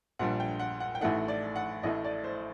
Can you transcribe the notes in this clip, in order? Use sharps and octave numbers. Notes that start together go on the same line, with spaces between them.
A#1 A#2 G3 D4 F#5
G5
F#5
F#5
G5
A1 A2 A3 D#4 F#5
D5
F#5
A1 A2 A3 D#5
D5
C5